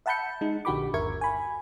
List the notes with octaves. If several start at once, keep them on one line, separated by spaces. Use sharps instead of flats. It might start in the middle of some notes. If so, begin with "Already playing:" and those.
E5 F#5 A5 B5 G6 C#7
G#3 D#4
A#1 D3 F#4 G4 B5 D6
G1 D#2 A#4 E5 C#6 G#6
G#5 B5